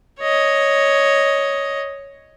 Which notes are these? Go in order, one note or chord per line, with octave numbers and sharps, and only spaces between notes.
C#5 D#5